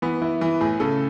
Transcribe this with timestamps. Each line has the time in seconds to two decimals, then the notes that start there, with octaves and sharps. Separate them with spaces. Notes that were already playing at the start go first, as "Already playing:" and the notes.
0.02 E3 B3
0.21 E3 E4
0.41 E3
0.61 A2 G#4
0.80 C#3 A4